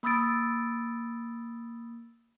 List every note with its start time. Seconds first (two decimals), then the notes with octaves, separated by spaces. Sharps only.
0.03 A#3 B5 D#6 E6 A6 D7